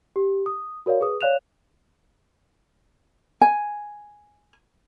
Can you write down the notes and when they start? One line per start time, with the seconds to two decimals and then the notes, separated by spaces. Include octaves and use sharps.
0.16 G4
0.46 D#6
0.86 F#4 A#4 C#5 D5 F5
1.01 G#4 B4 D#6
1.21 C#5 D5 F5 F#6 E7 F7
3.41 G#5